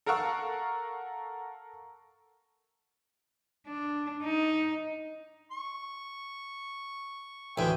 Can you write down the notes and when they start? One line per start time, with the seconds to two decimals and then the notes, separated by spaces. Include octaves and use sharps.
0.06 A4 A#4 F5 F#5 C#6 E6
3.67 D4
4.23 D#4
5.52 C#6
7.58 A1 D2 E5 G5 G#5